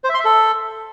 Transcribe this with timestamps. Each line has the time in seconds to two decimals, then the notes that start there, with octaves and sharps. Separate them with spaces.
0.04 C5
0.09 E5
0.14 C6
0.20 E5
0.25 A4